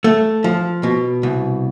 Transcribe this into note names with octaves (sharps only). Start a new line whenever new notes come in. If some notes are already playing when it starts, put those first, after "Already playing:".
A3
F3
B2
C2